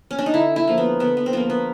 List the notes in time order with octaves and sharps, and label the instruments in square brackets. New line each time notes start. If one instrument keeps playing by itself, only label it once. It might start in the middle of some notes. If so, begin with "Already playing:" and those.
[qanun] C#4
D4
D#4
D3 E4
E4
F3 A#3
B3
D3 B3
B3
C4
F3 A#3 B3
B3